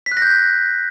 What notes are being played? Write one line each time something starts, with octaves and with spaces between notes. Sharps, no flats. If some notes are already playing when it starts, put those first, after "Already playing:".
B6
F#6
A#6
G6